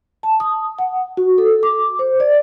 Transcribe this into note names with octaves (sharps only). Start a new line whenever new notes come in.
A5
D#6
F#5
F#4
A4
D6
C5
D5